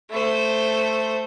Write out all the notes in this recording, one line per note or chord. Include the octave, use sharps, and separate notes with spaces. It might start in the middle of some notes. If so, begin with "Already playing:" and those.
A3 C5